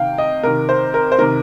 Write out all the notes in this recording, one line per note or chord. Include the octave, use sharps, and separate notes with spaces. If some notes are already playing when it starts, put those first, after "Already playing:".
Already playing: C3 D#3 F5 G5
D#5
C3 D#3 A#4
C5
A#4
C5
C3 D#3 A#4